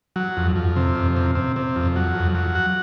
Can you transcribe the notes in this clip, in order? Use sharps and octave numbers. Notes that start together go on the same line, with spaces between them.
F#3
F2
F2
C3
F2
C3
C3
C3
F2
F#3
F2
F#3
F#4